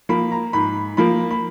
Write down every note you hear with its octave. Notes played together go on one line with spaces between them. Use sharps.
F3 A#3 B5
A#5
G#2 B5
F3 A#3 B5
B5